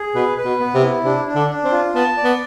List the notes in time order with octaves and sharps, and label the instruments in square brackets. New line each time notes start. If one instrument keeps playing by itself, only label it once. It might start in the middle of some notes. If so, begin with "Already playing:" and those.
Already playing: [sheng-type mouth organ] G#4
[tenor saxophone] B2 [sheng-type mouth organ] B4
[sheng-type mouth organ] B4
[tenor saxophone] B2
[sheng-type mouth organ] B3
[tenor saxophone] C3
[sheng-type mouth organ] E4
[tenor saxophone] C3 [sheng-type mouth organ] D4
[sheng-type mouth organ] D4
[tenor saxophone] D3
[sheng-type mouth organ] D4
[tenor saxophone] C4
[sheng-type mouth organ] F4
[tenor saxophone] B3 [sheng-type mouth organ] A5
[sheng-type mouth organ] D5
[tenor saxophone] B3